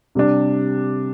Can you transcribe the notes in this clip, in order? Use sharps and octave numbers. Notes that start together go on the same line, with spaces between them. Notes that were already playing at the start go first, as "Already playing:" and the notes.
C3 G3 D4